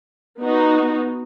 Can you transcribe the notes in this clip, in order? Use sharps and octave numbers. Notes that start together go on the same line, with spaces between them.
B3 D#4 F#4